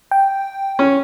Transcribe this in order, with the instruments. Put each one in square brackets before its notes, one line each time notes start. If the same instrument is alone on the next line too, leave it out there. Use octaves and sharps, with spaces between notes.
[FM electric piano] G5
[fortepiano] C#4